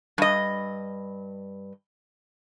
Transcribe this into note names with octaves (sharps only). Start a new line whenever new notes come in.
G2 D#5